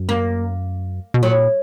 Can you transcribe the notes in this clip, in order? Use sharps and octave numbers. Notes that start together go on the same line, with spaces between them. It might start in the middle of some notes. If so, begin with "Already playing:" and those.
Already playing: F#2
A#3
B2
A#2 F#3